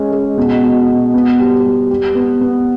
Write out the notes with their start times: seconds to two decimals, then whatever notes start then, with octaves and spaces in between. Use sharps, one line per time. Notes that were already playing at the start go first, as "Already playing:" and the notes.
Already playing: G#3 C#4
0.12 G#3
0.37 B2
0.63 B2
0.89 B2
1.14 B3
1.39 G3
1.65 G3
1.90 G3
2.15 B3
2.41 B3